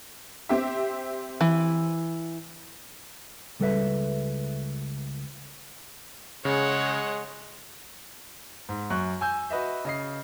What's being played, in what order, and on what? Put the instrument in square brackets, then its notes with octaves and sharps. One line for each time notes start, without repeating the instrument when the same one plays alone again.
[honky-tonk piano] C4 G4 E5
[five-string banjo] E3
[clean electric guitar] C#2 G3 A4 B4 E5
[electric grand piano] C#3 [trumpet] G#3 [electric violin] C#5 F#5
[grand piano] G#2
F#2 C#6 F#6
G#5 E6 G6
F#4 B4 D#5 E5
C#3 D#5 C7